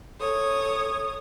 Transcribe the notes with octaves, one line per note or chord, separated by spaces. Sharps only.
A4 C#5 D#6